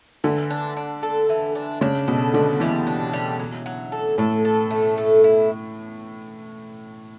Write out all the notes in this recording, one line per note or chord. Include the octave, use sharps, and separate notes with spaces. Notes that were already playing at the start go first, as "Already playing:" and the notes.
D3 E3
D4
D4
A4
E3
D4
C#3 D4
B2 A4
D3 D4
E3 G3
D4
G3
F#3
F#3
A4
A2 A4
A4
A3
A4
E4